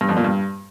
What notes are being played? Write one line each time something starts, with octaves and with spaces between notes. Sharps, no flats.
G2
F2
A#2
G2